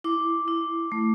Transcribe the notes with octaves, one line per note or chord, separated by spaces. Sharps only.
E4 D6
E4
A3